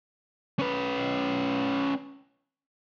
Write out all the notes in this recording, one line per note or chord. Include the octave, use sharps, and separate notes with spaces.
C#4 B4